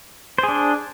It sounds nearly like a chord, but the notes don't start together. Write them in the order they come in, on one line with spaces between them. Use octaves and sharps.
C5 G#4 D4